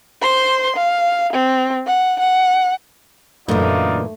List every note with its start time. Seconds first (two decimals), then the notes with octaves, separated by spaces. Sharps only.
0.22 C5 C6
0.76 F5
1.33 C4
1.87 F#5
2.20 F#5
3.48 F#2 A#2 D3 E3 A3 D#4 F4 D5